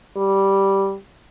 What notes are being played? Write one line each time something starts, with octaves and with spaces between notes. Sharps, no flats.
G3